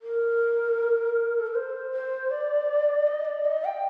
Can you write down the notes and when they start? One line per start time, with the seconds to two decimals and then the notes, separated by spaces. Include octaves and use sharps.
0.02 A#4
1.40 A4
1.47 A#4
1.55 C5
1.92 C5
2.31 D5
3.07 D#5
3.25 D5
3.45 D#5
3.65 G5